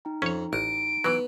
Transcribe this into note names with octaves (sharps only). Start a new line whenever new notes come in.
D#4 G5 A#5
F2 C#4 C#5
A1 D#5 D7
E3 F#3 B3